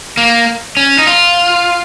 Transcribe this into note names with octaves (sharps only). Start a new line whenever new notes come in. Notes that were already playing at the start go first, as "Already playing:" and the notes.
A#3
C#4
D#4
F4